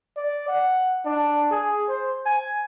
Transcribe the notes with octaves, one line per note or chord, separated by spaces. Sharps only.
D5
F#5
D4
G#4
C5
G#5